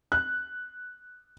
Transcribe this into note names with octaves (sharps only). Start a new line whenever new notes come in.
F#6